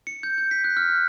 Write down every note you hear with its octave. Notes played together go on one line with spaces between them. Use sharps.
C#7
G6
G6
B6
F#6
F6
F#6